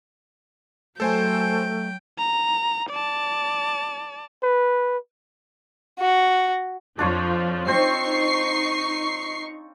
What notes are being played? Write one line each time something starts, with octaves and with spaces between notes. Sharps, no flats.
F#3 A3 A4 C5 G5 G#5
A#5
D5 A5
B4
F#4
F2 F3 D4 F4 C#5
C4 D#4 C5 C#6 C7